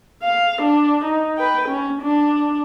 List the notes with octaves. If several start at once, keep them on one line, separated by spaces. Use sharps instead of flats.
F5
D4
D#4
B4 G5
C#4
D4